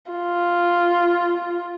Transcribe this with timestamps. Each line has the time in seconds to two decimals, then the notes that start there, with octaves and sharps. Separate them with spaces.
0.12 F4